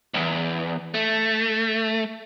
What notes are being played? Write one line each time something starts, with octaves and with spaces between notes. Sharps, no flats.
B1 E2
A3